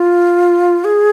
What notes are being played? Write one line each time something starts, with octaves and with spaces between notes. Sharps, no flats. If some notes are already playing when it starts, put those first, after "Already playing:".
Already playing: F4
G#4